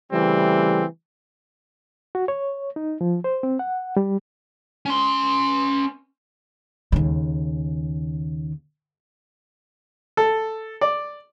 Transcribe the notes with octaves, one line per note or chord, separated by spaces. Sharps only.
C#3 E3 G3 A3 C4
F#4
C#5
D#4
F3
C5
C4
F#5
G3
C#4 C6
D#2 C#3
A4
D5